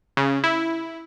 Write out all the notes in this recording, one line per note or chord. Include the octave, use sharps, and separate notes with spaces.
C#3
E4